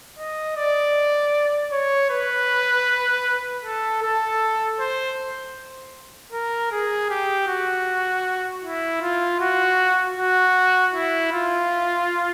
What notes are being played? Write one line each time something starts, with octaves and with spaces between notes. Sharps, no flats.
D#5
D5
C#5
B4
A4
A4
C5
A#4
G#4
G4
F#4
E4
F4
F#4
F#4
E4
F4